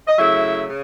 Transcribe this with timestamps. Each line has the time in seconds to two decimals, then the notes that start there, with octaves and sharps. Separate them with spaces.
0.07 D#5
0.18 C#3 F#3 A3 E4 E5
0.68 C#3